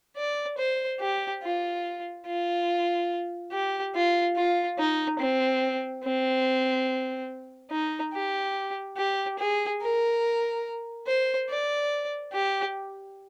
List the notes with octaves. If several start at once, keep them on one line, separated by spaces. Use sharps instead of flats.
D5
C5
G4
F4
F4
G4
F4
F4
D#4
C4
C4
D#4
G4
G4
G#4
A#4
C5
D5
G4